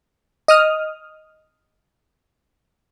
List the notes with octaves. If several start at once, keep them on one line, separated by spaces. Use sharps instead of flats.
D#5 D#6 F6